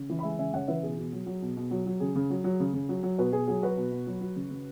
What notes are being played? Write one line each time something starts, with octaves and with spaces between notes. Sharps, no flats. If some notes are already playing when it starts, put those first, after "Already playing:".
Already playing: C#3
E3
B5
G#3 E5 G#5
C#3 E5 G#5
C#3 C#5 F#5
E3 B4 E5
B2 G#4
B2
F#3
F#3
B2
B2
F#3
F#3
C#3 G#4
C#3
F#3
F#3
C#3
C#3
F#3
F#3
B2 F#4 B4
B2 G#4
F#3 G#4
F#3 F#4 B4
B2
B2
F#3
F#3
C#3
C#3